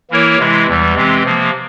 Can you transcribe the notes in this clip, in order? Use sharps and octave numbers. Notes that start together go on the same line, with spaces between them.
E3 A#3 E4 A#4 C#5
C3 E3 G#3 E4
E2 E3 G3
C3 E3 G#3 C4 G4
C3 F3 A#3